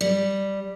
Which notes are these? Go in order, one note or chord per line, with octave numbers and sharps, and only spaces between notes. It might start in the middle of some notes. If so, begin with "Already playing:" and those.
G3